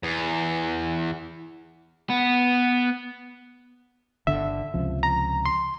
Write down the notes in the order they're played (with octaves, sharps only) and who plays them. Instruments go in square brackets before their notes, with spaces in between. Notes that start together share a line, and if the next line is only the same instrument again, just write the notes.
[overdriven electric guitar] E2
B3
[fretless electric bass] G1 D3 [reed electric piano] E5
[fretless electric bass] C#2 C3 F3
[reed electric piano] A#5
C6